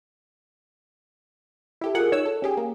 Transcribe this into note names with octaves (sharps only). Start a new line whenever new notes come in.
E4 G4 A4
F4 G#4 A#4 F#5
D#4 C#5 E6
A4
C#4 G4 G#4
A#3